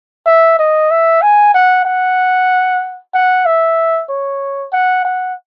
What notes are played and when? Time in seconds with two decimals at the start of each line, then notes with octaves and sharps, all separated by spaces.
0.26 E5
0.59 D#5
0.91 E5
1.22 G#5
1.54 F#5
1.86 F#5
3.14 F#5
3.46 E5
4.09 C#5
4.73 F#5
5.05 F#5